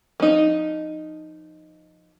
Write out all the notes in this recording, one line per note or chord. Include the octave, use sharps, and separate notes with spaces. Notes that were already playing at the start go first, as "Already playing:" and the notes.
F3 D#4